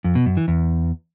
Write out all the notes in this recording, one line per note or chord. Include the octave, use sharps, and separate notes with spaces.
F2
B2
F#2
E3
E2